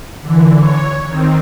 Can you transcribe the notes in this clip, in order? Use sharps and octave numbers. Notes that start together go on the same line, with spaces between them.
D3 E3
C#5
D#3 C4